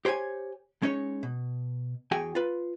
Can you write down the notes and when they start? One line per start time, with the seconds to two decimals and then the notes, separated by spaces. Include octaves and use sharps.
0.05 G4 C5 C#5 G5 G#5
0.82 G#3 C#4 D#4 C#5
1.23 B2
2.11 E2 F#4 G#4 G5 G#5
2.35 F4 B4